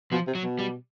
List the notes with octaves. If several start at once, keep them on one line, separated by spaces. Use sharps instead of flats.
B2 F3
C3
F#3
B2
G3